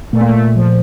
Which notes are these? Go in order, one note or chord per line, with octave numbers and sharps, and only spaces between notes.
A#2 A3
A#3
A3
F3